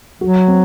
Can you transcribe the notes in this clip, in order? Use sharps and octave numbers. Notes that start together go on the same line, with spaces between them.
F#3 F#4
C4